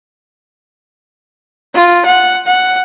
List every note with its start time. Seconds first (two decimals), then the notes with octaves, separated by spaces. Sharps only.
1.74 F4
2.06 F#5
2.46 F#5